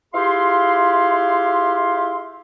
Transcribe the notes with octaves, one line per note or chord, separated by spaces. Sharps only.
E4 F4 G4 G#4 F5 C6